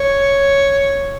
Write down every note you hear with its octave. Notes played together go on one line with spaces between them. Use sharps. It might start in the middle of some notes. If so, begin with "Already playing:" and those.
Already playing: C#5